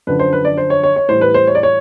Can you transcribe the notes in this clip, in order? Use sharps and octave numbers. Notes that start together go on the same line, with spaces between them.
F#2 D3 F3 B4
C5
B4
D5
C5
C#5
C#5
C#5
A2 E3 G3 C5
B4
C5
C#5
D5
C#5